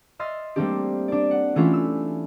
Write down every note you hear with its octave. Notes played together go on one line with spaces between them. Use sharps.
D#5 E5 C6 F6 A6
G3 A3 A#3 C4 D4 G4
D4 D5
F#5
E3 A3 C#4 D4 F4 E5
E6